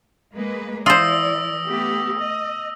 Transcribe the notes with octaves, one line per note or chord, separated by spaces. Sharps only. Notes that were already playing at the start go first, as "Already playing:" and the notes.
G#3 A#3 B4
E3 F4 C5 D5 D#6 E6 A#6
A3 B3 G4
D#5